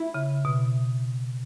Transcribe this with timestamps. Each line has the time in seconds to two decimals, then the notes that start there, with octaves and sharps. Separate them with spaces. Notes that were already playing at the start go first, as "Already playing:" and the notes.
Already playing: E4
0.14 C#3
0.45 B2